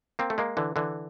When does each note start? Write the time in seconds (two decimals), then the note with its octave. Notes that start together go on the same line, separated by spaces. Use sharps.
0.19 A#3 C4
0.30 A3
0.38 G#3 A#3
0.57 D3 E3
0.76 D3 E3